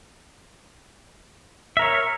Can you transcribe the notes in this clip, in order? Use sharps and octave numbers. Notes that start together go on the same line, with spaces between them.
A#4 C#5 E5